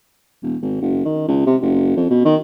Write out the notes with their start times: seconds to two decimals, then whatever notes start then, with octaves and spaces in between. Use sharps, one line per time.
0.43 E1
0.62 G#1
0.81 F#1
1.05 D#3
1.28 C#2
1.46 C3
1.62 F#1
1.97 F2
2.10 B2
2.25 D#3